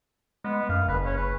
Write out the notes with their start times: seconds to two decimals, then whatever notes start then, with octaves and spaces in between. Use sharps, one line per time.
0.44 G#3 B3
0.69 F#2 F5
0.88 F#1 B4
1.05 C#4
1.17 B4